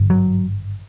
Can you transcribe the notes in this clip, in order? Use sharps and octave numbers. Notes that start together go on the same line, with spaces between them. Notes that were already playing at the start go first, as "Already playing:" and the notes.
Already playing: G#1 G2 D3
F#3